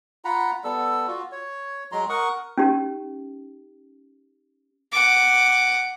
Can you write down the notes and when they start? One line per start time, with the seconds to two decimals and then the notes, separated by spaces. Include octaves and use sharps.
0.25 F4 F#5 A#5 B5
0.64 G3 B3 A4 E6
1.08 F4 F#4
1.32 C#5
1.92 F#3 G#3 A#5 C6
2.09 A#4 F#5 C#6 D#6
2.58 C#4 D#4 G4
4.92 F#5 D6